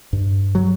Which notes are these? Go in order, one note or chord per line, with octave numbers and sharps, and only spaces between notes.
G2
F#3